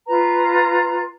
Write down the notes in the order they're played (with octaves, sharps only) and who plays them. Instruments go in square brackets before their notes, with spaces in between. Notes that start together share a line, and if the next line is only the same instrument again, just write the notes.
[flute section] F4 B4 A#5